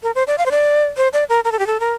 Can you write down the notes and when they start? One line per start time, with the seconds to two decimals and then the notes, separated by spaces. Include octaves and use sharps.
0.03 A#4
0.15 C5
0.27 D5
0.38 F5
0.46 C5
0.51 D5
0.97 C5
1.13 D5
1.29 A#4
1.45 A#4
1.52 A4
1.59 G4
1.67 A4
1.80 A#4